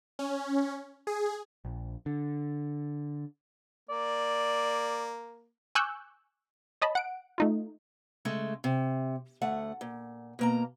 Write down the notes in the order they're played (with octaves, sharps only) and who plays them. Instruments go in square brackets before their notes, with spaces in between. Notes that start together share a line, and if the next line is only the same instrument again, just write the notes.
[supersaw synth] C#4
G#4
[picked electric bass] A#1
D3
[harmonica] A#3 [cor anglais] D5
[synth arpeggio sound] G#5 C#6 D6 E6 F#6 G6
C#5 D#5 A5 B5
F#5 D7
A3 D#4 F4
[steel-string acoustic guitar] C#3 G#3 A3
C3
D2 A3 F#5
A#2
B2 A#3 A#5